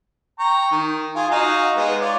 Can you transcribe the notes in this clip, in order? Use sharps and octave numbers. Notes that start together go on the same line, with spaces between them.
G5 A#5 C#6
D#3
F4 G#4
D#4 F#4 F5
G#3 B3
F4 C#5 D5